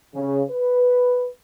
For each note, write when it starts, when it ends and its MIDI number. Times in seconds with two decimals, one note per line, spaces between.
0.14 0.42 49
0.50 1.27 71